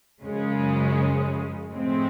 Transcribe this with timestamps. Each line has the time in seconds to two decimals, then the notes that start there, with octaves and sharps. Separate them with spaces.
0.22 F#2 C#3 F3 G#3 C#4
1.71 A2 F3 G#3 C4